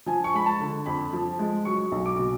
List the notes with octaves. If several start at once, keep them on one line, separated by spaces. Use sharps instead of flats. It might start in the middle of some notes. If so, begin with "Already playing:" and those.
F3 G#5
C#6
G#3 B5
A5
D3
F2 B5
F3
G#3
F#3 C#6
B1
D6
B2